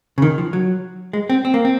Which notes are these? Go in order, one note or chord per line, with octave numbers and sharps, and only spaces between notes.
C#3
D#3
F3
F#3
G#3
C4
C4
A#3
C4